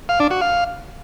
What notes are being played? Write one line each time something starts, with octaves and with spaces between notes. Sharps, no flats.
F5
D4
F#4
F5